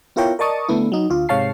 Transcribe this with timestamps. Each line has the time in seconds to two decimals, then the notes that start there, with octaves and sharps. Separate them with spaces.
0.16 B3 E4 F4 A#4 C#5 G5
0.39 A#4 D5 D#5 A5 C#6 D#6
0.69 D3 A3 B3 E4
0.92 F#3 D#4
1.10 D2 F4
1.29 G#2 C3 C#5 F5 A5 C7